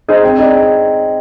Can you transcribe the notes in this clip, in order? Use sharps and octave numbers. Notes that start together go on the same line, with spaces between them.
D#4 G#4 C5 D#5
C4
D#4 G#4 D5